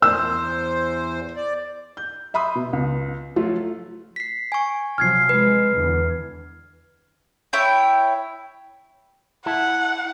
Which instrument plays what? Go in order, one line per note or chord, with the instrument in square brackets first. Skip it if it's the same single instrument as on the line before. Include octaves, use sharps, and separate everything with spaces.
[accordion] E2 C5 [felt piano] E6
[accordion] D5
[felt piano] G6
E5 B5 C6 D#6
B2
C#2
F3 F#3 A3 F4
[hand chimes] B6 C7
G#5 C#6
[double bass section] C3 F3 F#3 [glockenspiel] F6 G#6 C7
[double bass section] C3 G#3 [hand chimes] B4
[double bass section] E2 D3 E3
[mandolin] E4 C#5 G5
[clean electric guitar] E4 E5 A5 [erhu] F#5